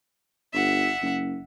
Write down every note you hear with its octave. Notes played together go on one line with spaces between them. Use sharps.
G1 E5 F#5
F#1